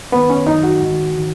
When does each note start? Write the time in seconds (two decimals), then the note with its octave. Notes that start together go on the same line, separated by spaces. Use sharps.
0.12 F#2 D#3 B3
0.30 C#4
0.46 F#2 D#3 D#4
0.63 F#4
0.79 G#2 D#3
1.18 D#3